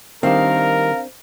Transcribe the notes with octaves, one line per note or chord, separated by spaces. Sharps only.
D#3 G3 C4 D4 A#4 F5